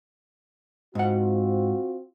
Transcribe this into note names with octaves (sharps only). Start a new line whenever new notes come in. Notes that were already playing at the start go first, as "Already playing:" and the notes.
G#2 C4 F4 F#4 F#5